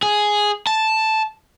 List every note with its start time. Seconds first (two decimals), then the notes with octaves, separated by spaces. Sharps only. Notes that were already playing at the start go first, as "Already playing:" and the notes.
0.03 G#4
0.67 A5